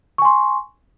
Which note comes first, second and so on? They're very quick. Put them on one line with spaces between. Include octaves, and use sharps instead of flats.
C#6 G#5 C6